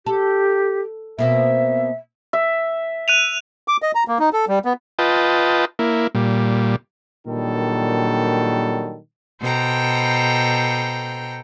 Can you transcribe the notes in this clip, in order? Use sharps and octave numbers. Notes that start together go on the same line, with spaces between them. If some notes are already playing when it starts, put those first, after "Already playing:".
G4 A4
B2 A#3 C4 E5
E5
F#6 D#7 F7
D6
D#5
A#5
A#3
D#4
A4
G3
B3
F4 B4 D#5 G5 A5
A#3 E4
A#2 G3
A#2 D#3 F#3 G3 D4 A4
B2 A4 C5 G5 A#5